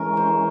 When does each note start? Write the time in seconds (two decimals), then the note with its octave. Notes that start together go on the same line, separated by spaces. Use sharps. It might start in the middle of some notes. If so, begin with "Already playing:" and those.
Already playing: E3 G#3 C#4 A#4
0.17 C5